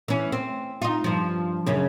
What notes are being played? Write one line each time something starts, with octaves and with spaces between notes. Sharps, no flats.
E3 C#4
C4
D#4 F4
G2 F3
F#2 C#3 C#4